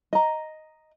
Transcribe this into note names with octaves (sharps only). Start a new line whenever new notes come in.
D#5 A#5